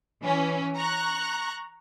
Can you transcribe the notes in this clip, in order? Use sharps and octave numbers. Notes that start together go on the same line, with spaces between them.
E3 C#4
A#5 C#6 F#6